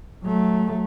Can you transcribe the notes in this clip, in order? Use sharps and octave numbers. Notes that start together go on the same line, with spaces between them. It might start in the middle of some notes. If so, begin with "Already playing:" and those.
F#3 A3